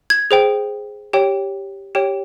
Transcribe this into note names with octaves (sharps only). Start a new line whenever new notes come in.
G#6
G#4 C5 G5
G4 C#5 G5
G4 C#5 G5